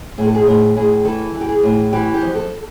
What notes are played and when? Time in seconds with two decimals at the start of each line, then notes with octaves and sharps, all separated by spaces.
0.18 A2 G#4
0.26 A4
0.35 G#4
0.47 A2 G#4
0.76 A2 G#4
1.05 E3 A4
1.34 E3
1.41 G4
1.49 G#4
1.63 A2
1.93 E3 G4
2.14 G4
2.22 F2
2.35 A4